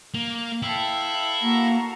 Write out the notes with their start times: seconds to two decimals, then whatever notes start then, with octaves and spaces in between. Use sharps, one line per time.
0.14 A#3
0.63 E4 A4 F5 G5
1.42 A#3 F#4 A#5